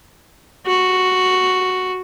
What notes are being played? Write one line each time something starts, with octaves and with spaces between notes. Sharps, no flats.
F#4